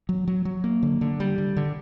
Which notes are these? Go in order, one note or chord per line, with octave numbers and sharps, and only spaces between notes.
F#3
F#3
F#3
A#3
D3
D3
G3
D3
D3